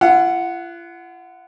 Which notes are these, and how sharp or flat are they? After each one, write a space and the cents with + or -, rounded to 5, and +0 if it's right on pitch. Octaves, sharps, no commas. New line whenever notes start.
F4 -45 F#5 +0